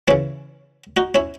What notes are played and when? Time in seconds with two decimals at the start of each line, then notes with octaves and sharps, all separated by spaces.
0.08 C#3 E3 C#4 E4
0.97 D#4 F#4
1.15 C#4 E4